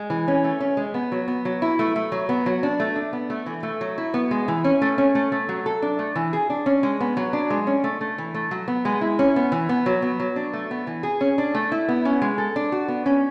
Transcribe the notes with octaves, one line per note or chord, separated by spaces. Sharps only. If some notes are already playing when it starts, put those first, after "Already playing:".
Already playing: G#3
E3
C#4
A3
C#4
G#3
B3
F#3
B3
F#3
E4
A3
A3
F#3
B3
F#3
D4
A3
D4
B3
A3
E3
A3
F#3
E4
B3
G#3
E3
C#4
A3
C#4
A3
A3
F#3
A4
D4
A3
E3
G#4
D4
C#4
G#3
B3
F#3
D4
G#3
C#4
A3
A3
E3
A3
F#3
B3
G#3
E4
C#4
B3
E3
B3
F#3
B3
F#3
D4
A3
B3
E3
G#4
C#4
D4
A3
E4
B3
C#4
G#3
A4
D4
F#4
B3
C#4